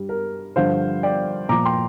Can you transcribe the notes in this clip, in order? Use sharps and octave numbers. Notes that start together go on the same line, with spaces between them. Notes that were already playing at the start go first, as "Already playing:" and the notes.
Already playing: G2 G3
A#4
G2 D3 F3 C5 F5
D5 G5
A#2 F3 A#5 D6
G5 C6